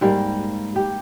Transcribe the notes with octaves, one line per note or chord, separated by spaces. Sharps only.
G#2 G3 A#3
G4